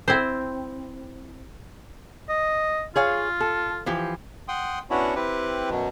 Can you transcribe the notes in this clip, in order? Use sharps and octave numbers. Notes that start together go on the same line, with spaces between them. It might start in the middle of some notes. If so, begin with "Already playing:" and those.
C4 E4 C5
D#5
F4 G#4 C#5 F5
A4
E3 F3 G4
F#5 G5 C6 D#6
B3 C#4 D4 E4 F#4 C#5
C4 E4 G4 B4
F#2 B2 F#3